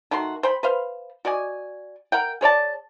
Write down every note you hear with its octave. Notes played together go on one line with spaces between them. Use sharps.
D#3 A3 F#4 C6
C5 G5 B5
B4 C5 F5
F#4 D5 D#5 G#5
A#4 F#5 G5
G#4 C#5 D5 A5